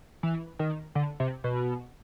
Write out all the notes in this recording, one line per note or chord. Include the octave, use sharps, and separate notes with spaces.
E3
D#3
D3
C3
B2